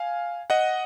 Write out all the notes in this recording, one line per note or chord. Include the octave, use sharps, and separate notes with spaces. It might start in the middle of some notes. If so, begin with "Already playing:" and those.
Already playing: F5 G#5
D#5 F#5